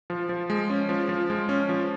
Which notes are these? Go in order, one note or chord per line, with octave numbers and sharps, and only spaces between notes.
F3
F3
G#3
C#4
F3
F3
G#3
C#4
F3